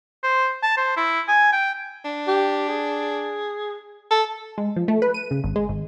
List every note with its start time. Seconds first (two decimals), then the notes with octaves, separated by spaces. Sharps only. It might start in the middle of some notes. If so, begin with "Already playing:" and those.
0.24 C5
0.63 A5
0.77 C5
0.97 E4
1.28 G#5
1.53 G5
2.04 D4
2.28 G4
2.69 G#4
4.10 A4
4.58 G#3
4.76 F3
4.88 A3
5.02 B4
5.14 D#7
5.31 C#3
5.44 G#1
5.56 G#3
5.69 G#1